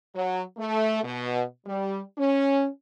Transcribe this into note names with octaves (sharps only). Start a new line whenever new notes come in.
F#3
A3
B2
G3
C#4